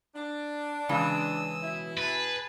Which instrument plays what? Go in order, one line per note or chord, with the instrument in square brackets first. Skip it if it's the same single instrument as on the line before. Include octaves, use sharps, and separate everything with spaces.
[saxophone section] D4
[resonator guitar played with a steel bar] C#3 E3 G#3 [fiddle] D#6 E6
[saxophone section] B2 E4
[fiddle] G#4 A5 [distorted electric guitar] B4